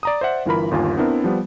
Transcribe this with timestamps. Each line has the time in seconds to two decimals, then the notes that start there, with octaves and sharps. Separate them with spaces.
0.03 D5 A#5 D#6
0.21 C5 D5 E5 F#5
0.46 G1 E3 F4 A#4 B5
0.71 G1 D#2 F4 G#5
0.97 B3 C4 D4 E4 A#4
1.24 F3 G3 B3